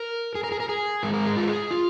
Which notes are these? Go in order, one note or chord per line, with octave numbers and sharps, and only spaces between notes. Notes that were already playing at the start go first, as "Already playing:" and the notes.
Already playing: A#4
G#4
A#4
G#4
A#4
G#4
G#2 G#3 A#4
A#4
G#4
F4
G#4
F4